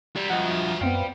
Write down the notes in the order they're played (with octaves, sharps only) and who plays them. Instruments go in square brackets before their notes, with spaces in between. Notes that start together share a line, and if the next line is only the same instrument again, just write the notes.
[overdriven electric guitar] G3 [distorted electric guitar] F#4 E5
[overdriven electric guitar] G2 F3 [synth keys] D#5 F#5
[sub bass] F#2 [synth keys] B3 C4 F5 [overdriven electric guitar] D5 G5